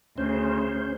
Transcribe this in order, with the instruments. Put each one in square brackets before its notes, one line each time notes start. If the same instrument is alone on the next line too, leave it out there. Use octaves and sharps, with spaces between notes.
[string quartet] D2 C#3 [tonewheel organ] C#4 C5